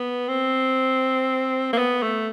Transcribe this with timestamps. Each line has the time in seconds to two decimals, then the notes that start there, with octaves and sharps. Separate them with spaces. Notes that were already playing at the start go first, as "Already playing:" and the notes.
Already playing: B3
0.29 C4
1.73 A#3
1.78 B3
2.03 A3